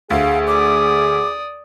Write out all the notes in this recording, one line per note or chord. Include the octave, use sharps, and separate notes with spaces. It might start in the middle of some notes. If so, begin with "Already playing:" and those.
D2 G#4 F5
D5 D6 D#6